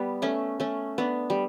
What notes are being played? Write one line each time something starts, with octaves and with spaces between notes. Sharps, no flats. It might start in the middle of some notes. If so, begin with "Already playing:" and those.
Already playing: G3 B3
A3 C#4
A3 C#4
B3 D4
G3